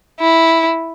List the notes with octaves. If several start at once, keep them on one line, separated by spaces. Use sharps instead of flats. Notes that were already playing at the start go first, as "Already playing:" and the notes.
E4